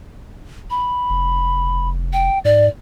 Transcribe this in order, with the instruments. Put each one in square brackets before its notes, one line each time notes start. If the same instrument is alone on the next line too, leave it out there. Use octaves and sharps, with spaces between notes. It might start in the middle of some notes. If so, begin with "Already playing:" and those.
[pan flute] B5
[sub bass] F1
[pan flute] G5
[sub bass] G#2 [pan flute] D5